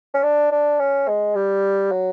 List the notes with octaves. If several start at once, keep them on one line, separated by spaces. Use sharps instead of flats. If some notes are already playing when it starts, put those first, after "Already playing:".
C#4
D4
D4
C#4
G#3
G3
F#3